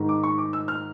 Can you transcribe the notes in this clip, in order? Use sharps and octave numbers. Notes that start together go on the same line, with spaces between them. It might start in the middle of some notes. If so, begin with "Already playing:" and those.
Already playing: G#2 D#3 G#3
D6
C#6
D6
E6
F6